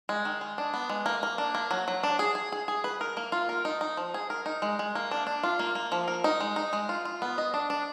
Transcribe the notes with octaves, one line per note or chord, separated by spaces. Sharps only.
G#3
D#3
G#3
D4
B3
G#3
A#3
A#3
D4
A#3
F#3
F#3
D4
G#4
G#4
G#4
G#4
B4
A#4
A#3
F4
A#4
D#4
D#4
F3
G#4
A#4
D#4
G#3
G#3
A#3
D4
D4
F4
A#3
A#3
F3
A#4
D#4
G#3
D#4
G#3
F4
F4
B3
D#5
D4
D4